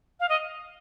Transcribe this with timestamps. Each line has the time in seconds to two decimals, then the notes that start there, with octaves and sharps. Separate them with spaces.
0.20 F5
0.29 D#5